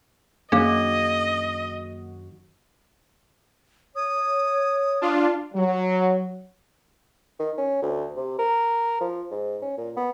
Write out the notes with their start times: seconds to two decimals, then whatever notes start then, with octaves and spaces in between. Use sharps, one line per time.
0.52 F#2 D#3 A#3 D4 F#4 G#4 D#5 F5
3.96 C#5 D#6
5.01 D4 F4
5.54 F#3
7.40 D#3
7.58 C#4
7.82 D2
8.16 C3
8.39 A#4
9.01 F3
9.31 G#2
9.62 C#4
9.78 A#2
9.97 B3